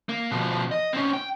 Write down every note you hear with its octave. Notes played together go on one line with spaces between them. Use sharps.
A#3
B2 F3
D#5
C4 C#4
G5